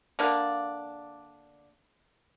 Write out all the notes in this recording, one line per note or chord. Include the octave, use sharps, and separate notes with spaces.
D3 A#3 D4 F5